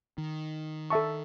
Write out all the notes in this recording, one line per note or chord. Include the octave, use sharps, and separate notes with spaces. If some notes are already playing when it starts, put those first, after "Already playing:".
D#3
A4 E5 A5 C#6